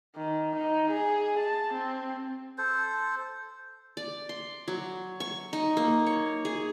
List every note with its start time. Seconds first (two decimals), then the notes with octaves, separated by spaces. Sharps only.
0.17 D#3
0.56 D#4
0.91 G#4
1.39 A5
1.73 C4
2.58 A4 C5
3.97 D5
4.29 C6
4.68 F#3
5.20 C#6
5.53 D#4
5.77 A#3
6.06 C#5
6.45 G#4